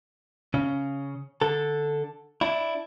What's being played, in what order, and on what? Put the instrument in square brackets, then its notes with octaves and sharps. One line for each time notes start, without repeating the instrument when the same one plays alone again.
[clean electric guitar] C#3 C#4
D3 A4
D4 E4